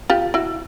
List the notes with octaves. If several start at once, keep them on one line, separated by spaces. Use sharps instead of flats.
F4 G4
E4 F#4